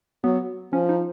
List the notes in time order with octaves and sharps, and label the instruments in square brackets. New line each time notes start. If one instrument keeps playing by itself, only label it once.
[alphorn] F#3 [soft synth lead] B3
[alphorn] F3 [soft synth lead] C#4
[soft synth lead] D#4